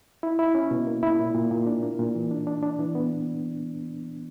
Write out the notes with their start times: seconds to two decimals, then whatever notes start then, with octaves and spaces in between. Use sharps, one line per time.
0.23 E4
0.39 E4
0.55 C#4
0.71 B2
0.87 A#3
1.03 E4
1.19 A#2
1.35 A#2
1.51 A#2
1.67 D4
1.83 A#3
1.99 A#2
2.15 E3
2.31 D4
2.47 D4
2.63 D4
2.79 E3
2.95 B3